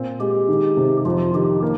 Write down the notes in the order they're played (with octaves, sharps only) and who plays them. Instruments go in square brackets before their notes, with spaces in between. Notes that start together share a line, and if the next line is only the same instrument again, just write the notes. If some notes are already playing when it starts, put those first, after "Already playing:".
Already playing: [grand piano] A#2 C4
[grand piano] G#3 [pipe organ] G4
[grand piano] D#3
C3
[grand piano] F2 [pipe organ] F4
[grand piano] D#3 [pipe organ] G4
[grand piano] A#3